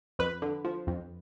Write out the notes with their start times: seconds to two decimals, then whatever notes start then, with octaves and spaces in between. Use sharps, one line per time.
0.19 F2 B4
0.42 D3
0.65 F3
0.87 F2